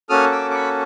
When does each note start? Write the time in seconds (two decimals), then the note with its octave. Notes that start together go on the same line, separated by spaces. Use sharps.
0.09 A#3 C#4 F#4 A4 D#6 F6
0.32 D6 E6
0.51 D6
0.53 B5 C#6